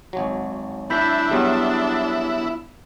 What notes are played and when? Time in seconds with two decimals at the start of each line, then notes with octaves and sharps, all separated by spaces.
0.13 G#1 F#3
0.90 D4 E4 B5 G6 B6
1.31 F#3 G3 B3 G#4